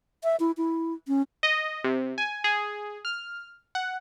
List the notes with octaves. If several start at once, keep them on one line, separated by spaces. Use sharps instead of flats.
E5
E4
E4
C#4
D#5
C3
G#5
G#4
F6
F#5